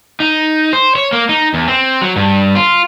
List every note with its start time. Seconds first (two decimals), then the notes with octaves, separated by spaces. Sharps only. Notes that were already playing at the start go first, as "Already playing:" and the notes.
0.20 D#4
0.73 C5
0.96 C#5
1.12 A#3
1.29 D#4
1.54 E2
1.68 C4
2.02 F#3
2.16 G2
2.55 F4